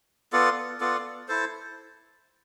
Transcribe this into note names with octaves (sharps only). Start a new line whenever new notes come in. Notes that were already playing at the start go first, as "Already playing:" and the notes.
B3 F4 A4 D5
B3 F4 A4 D5
E4 A4 C5